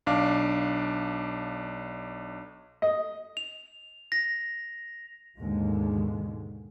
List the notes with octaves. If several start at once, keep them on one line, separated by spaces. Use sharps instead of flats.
B1 D4 F5 D6
D#5
F7
A#6
D#2 G#2 B2 D3 D#3 G#3